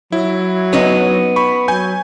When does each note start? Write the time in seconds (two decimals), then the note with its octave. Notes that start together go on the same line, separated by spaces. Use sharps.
0.12 F#3 E4
0.73 B3 C#4 D#4
1.36 B5 C#6
1.68 F#3 G#5 G6